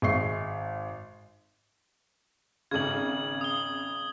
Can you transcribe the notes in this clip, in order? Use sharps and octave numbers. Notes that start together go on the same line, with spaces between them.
G#1 G#3 E5 C#6 C7
G#1 C#3 G#6 F#7
D#6 G7